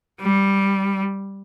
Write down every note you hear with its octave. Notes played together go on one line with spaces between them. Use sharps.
G3